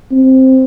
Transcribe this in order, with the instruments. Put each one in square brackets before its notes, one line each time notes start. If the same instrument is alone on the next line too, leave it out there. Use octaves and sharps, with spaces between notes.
[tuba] C4